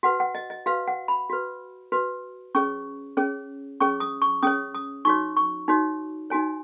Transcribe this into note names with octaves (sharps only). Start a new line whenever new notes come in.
F#4 B4 F#5
F#5
D#5
D#5
F#4 B4 F5
F#5
B5
F#4 B4
F#4 B4
C#4 G#4 C#5 C#6
C#4 G#4 C#5
C#4 G#4 C#5 C#6
D#6
C#6
C#4 G#4 C#5 D#6
D#6
D#4 F#4 C#5 C#6
C#6
D#4 F#4 C#5
D#4 F#4 C#5 G#5